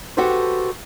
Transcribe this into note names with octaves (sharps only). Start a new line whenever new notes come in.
F#4 G4 A4 B4 C5